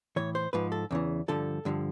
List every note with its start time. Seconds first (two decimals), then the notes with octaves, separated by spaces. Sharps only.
0.16 A2 E3 C#5
0.35 C5
0.53 G#2 F3 B4
0.72 A4
0.91 E2 C#3 E3
1.28 G2 D3 F3 A4
1.65 G2 D3 F3